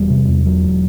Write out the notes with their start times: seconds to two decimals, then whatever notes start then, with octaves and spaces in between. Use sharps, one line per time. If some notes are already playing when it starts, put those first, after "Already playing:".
Already playing: E1 G3
0.10 C3
0.28 E2
0.46 E1 F#3
0.62 E1